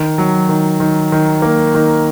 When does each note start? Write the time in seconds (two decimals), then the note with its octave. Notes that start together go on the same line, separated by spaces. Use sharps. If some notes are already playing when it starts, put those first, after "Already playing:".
Already playing: D#3
0.18 F#3
0.49 D#3
0.80 D#3
1.12 D#3
1.42 A#3
1.74 D#3